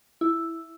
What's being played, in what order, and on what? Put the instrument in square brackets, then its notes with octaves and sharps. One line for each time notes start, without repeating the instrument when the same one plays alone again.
[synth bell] E4